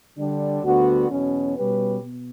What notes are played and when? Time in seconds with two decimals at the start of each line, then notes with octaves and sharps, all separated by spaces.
0.18 D3 G3 D4
0.64 D2 D3 G3 B3 F#4
1.10 E2 B2 F#3 C#4
1.56 B2 G3 C#4 G4 B4
2.02 B2